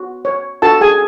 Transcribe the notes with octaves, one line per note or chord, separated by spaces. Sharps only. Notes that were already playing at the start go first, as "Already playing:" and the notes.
Already playing: F#4
C#5
F#4 A4 A5
G#4 G#5